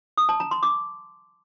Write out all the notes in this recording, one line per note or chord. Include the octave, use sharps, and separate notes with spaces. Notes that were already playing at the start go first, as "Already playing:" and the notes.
D#6
A5
A#5
C6
D6